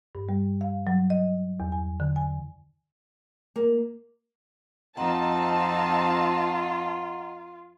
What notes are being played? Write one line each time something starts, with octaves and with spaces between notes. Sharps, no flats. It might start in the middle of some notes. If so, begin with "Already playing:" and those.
G2
G3
F5
F#3
D#5
E2
G#5
D3
G#5
A#3
F2 C4 D#4 F4 D#5 F#5 A5 A#5